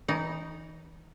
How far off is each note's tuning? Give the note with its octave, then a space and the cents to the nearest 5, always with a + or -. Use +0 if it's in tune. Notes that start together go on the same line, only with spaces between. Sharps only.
E3 -30 D#4 +0 D5 -45